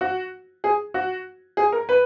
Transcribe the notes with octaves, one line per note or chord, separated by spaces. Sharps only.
F#4
G#4
F#4
G#4
A#4
B4